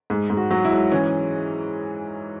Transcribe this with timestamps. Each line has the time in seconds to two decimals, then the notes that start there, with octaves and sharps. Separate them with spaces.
0.10 G#2
0.30 G#2
0.37 F#4
0.51 F#3
0.65 E4
0.71 G#2
0.92 E3 C#4